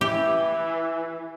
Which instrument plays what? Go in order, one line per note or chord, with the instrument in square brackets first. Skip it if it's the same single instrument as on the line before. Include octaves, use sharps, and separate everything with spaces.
[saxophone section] E3 [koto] G4